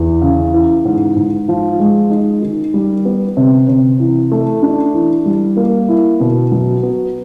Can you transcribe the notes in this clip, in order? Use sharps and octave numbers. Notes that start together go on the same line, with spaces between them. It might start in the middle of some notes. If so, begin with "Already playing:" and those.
Already playing: E2
C#3
E3
G#2
G#2
F3
G#3
D#4
D#3
G3
B3
C3
C3
E3
A3
D4
E3
G3
A#3
E4
B2
F#3
B3